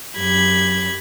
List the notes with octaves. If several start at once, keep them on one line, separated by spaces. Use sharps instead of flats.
F#2 G4 B5 G#6